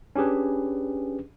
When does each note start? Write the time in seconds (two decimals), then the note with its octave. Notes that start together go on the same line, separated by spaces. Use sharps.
0.16 C#4 D4 G4 G#4 B4